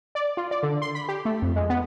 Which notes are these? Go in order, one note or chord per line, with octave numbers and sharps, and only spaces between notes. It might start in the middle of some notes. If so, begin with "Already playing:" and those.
D5
F4
D5
D3
C6
B5
G4
A3
F2
G#3
B3